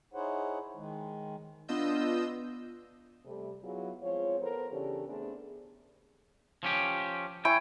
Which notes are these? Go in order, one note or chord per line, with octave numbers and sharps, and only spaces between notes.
D#4 E4 G#4 C5 C#5 F#5
D#3 G#3
B3 D4 F4 D#5 E6 G6
C3 G3 A3
F#3 B3 E4 F4 G#4
F3 G#3 C4 F4 C#5
B3 A4 A#4 C5
C#3 E3 D4 G4 A4 C#5
A3 B3 C4 D4 G#4
F3 C#4 G4
E4 G5 G#5 C#6